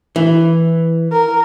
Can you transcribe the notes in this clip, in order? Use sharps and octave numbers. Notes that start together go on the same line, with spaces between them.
E3
A#4